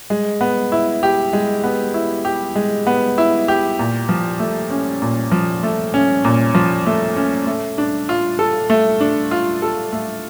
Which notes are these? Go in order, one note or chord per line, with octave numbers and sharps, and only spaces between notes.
G#3
B3
E4
G4
G#3
B3
E4
G4
G#3
B3
E4
G4
A#2
F3
A3
C#4
A#2
F3
A3
C#4
A#2
F3
A3
C#4
A3
D4
F4
A4
A3
D4
F4
A4
A3